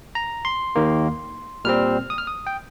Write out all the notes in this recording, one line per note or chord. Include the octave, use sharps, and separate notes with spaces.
A#5
C6
D#2 D#3 A#3
A#2 G3 C4 F6
D#6
F6
D#6
G5